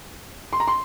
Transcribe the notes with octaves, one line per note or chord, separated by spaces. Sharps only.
C6
A#5
C6